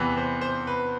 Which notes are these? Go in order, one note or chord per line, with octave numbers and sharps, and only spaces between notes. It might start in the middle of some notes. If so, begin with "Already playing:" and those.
Already playing: E2 C3 E3 B4
C5
C5
B4